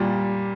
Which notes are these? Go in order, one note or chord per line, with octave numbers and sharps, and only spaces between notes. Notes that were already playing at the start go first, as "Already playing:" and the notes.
Already playing: A#2 G3